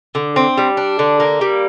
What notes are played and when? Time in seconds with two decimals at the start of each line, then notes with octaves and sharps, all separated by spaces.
0.15 D3
0.36 C4
0.57 G3
0.77 D4
0.99 D3
1.20 A#3
1.41 G3